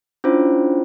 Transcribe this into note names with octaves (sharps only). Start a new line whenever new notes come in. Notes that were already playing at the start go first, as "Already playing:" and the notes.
C#4 D4 E4 F4 C5